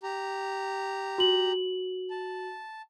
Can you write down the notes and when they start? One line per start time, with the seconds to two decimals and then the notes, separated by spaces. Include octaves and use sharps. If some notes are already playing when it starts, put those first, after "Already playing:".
0.03 G4 A#5
1.18 F#4 F#7
2.10 A5